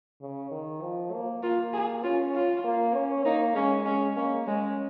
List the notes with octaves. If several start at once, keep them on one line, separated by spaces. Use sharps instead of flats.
C#3
D#3
F3
A#3
A#3 F4
G#4
C#4 F4
F4
A#3
C#4
A#3 D#4
G#3 C#4
G#3 C#4
A#3 C#4
G#3 C#4